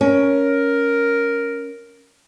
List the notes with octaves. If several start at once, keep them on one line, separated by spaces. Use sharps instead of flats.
C#4 A#4